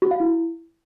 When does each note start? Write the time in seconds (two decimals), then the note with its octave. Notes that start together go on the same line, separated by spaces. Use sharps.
0.02 F#4
0.11 F5
0.20 E4